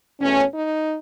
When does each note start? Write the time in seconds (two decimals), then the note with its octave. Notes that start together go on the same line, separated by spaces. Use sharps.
0.20 E2 B2 A3 C#4
0.51 D#4